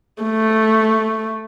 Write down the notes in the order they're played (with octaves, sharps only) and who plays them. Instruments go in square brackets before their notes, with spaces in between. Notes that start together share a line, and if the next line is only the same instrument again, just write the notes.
[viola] A3